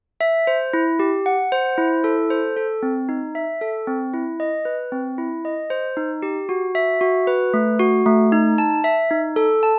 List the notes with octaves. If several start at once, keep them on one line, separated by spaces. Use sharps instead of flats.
E5
C5
E4
G4
F#5
C5
E4
A4
C5
A4
C4
D#4
E5
A4
C4
E4
D#5
B4
C4
E4
D#5
C5
D#4
G4
F#4
E5
F#4
B4
A3
F#4
A3
D#4
A5
E5
D#4
A4
A5